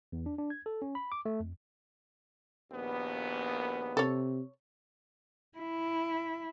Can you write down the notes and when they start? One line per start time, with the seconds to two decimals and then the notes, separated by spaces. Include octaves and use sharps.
0.12 E2
0.26 D4
0.38 D4
0.50 G#6
0.66 A4
0.82 C#4
0.95 B5
1.12 D6
1.25 A3
1.40 F2
2.71 A#1 D#2 B3
3.97 C3 A4 C#5
5.58 E4